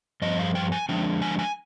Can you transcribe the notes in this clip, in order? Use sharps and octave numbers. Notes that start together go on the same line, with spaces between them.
G2 F3 D#5
F5
G5
G#5
D3 F3 G#3 D4 G5
G#5
G#5